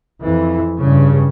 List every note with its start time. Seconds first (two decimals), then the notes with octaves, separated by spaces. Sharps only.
0.20 F2 E3
0.79 G2 C#3